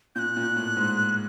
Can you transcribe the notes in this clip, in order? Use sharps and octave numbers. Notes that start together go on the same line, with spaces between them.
A#2 F#6 G6
A#2
A2
G#2